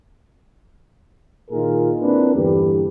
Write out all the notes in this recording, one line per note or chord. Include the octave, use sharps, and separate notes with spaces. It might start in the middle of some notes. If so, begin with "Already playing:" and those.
A#2 D#3 D#4 F4 G#4 A#4
A#3 C4 D4 E4 A#4 B4
E2 G2 D3 G4